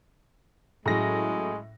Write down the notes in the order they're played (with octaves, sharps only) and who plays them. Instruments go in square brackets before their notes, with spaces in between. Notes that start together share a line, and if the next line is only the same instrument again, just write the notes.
[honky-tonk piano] A2 A#6 [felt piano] F#3 C#4 G#4 [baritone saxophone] G#3